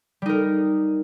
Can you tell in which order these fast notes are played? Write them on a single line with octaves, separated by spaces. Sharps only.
G3 D#4 A#4